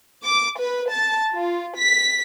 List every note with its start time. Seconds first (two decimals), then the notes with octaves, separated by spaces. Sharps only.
0.24 D6
0.59 B4
0.89 A5
1.33 F4
1.78 B6